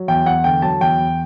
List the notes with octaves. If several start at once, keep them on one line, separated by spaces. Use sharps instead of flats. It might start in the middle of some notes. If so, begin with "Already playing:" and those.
Already playing: F#3
E2 G5
E2 F#5
D3 G5
F#3 A5
E2 G5
E2